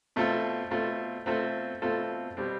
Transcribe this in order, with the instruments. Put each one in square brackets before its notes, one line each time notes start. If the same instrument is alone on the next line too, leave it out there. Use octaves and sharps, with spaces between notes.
[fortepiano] B2 A3 C4 F4 A4
B2 A3 C4 F4 A4
B2 A3 C4 F4 A4
B2 A3 C4 F4 A4
B2 G3 C4